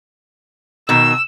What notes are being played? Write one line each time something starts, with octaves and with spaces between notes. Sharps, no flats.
B2 D#3 E6